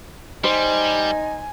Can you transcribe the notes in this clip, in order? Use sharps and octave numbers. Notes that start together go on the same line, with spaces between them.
G3 D#4 C5 G#5